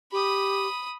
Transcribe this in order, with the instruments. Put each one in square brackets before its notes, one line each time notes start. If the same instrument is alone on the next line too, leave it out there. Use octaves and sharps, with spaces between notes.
[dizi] G4 [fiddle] B5 D#6